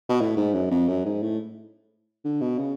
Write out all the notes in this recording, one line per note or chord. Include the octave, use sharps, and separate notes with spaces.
B2
A2
G#2
F#2
F2
F#2
G#2
A2
D3
B2
C#3